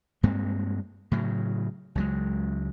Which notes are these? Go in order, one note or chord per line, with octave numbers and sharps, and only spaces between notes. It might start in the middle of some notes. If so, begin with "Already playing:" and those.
G2 G#3 A#3 C4
A2 C#3 F#3
C#2 F#3 G#3